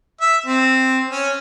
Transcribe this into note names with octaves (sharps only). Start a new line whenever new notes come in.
E5
C4
C#4